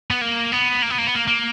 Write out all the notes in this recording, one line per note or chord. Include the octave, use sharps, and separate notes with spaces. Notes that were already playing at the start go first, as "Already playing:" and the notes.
B3
A#3
B3
A#3
B3
A#3
B3
A#3
A#3